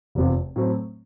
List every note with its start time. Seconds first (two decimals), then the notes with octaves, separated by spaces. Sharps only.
0.15 F1 E2 C3 F3
0.56 A2 F#3 A3 C4